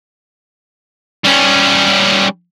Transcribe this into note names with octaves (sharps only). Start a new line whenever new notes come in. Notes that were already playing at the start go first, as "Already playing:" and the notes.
G3 C#4